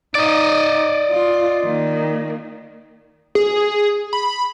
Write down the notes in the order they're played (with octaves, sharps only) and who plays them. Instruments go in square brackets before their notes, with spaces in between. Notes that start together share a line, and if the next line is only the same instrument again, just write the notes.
[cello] D#4 [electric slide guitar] D5 D#5
[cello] F4
D#3 A#3
[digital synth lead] G#4
B5